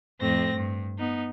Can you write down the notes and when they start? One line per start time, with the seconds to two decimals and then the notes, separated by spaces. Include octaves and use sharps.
0.20 F2 A2 C4 A#6
0.53 G2
0.99 B3 D#4